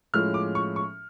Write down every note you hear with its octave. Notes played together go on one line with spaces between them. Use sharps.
A2 F3 G#3 C#4 F6
D6
C#6
C#6